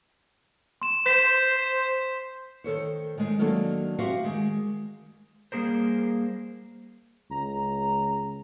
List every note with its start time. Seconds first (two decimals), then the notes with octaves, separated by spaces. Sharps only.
0.82 C6 E7
1.06 C5 B6 E7
2.64 D#3 A4 C5 C#5
3.18 D#3 G#3 D#4
3.39 D#3 F#3 A#3 D4 A4
3.99 F#4 G4 C5 E5 F5
4.24 D#3 G#3
5.52 G3 A#3 G#4 A#4 C5
7.30 C#2 A#5